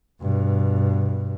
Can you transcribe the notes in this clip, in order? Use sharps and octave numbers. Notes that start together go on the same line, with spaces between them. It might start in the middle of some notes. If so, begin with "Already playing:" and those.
G2 B2